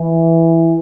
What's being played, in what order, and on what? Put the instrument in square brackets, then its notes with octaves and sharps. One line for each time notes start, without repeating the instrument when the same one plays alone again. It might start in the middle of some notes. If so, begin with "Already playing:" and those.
Already playing: [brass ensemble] E3